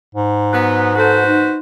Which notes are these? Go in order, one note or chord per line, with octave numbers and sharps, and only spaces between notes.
G#2
F#3 B3
F#4 A4 B4 C5
D#4